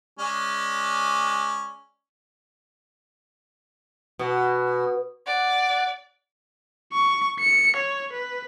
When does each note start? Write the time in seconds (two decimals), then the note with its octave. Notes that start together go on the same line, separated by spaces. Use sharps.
0.19 G#3 C#4 D5
4.19 B2
5.26 D5 F#5
6.93 C#6
7.40 C#7
7.76 C#5
8.13 B4